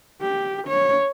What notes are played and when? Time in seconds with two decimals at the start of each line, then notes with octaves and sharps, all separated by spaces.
0.21 G4
0.68 C#5